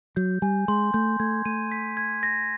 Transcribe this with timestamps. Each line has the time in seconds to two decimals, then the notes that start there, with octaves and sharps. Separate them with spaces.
0.16 F#3 G6
0.42 G3 G#5
0.68 G#3 C6
0.94 A3 G6
1.20 A3 G#6
1.45 A3 D#7
1.72 B6
1.97 G#6
2.23 A#6